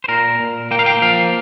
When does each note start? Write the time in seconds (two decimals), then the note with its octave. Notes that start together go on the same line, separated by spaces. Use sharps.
0.04 C5
0.08 A#2 A#4
0.39 A#2
0.71 A#3 G5
0.79 F5
0.86 G5
1.02 F3 F5